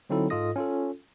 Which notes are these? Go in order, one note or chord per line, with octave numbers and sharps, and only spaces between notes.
D3 F#3 C4 D#4 E4 A4
G#2 F4 A4 D#5 D#6 A#6
C#4 F4 A4